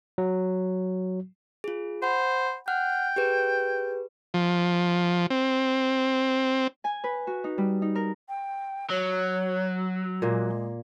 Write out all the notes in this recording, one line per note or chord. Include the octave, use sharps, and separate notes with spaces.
F#3
F4 G#4
C5 F#5 B5
F#5 G5 F6 F#6
G4 G#4 B4
F3
C4
G#5
B4
F#4
D#4
G3
D#4
A#4
G5
F#3 C#5
A#2 G#3 A#3